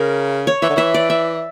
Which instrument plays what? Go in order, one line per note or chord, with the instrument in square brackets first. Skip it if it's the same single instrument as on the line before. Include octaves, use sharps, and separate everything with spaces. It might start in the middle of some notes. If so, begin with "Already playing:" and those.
Already playing: [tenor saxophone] C#3 [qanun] A#4
[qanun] C#5
[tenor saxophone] E3 [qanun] E5
[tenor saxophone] D3
[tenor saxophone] E3 [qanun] E5
[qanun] D5
E5